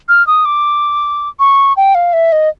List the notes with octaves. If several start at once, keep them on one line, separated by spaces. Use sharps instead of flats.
F6
D#6
D6
C#6
G5
F5
E5
D#5